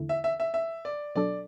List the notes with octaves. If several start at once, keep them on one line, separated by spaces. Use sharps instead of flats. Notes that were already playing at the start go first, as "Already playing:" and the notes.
Already playing: E2 D3 A3 E4
E5
E5
E5
E5
D5
B2 F#3 D4 A4 D5